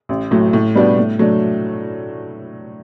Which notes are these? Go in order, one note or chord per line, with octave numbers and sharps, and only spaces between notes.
A1
A2 F#3 A3
A2
G3 B3 D4 F#4
A2
F#3 A3 D4